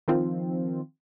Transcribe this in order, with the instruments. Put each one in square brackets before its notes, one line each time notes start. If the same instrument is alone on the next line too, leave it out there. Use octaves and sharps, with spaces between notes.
[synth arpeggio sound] D#3 F3 C4 F4